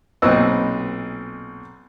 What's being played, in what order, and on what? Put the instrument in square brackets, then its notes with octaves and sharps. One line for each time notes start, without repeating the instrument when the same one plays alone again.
[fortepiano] B1 A#2 C4 B4 D#5 E6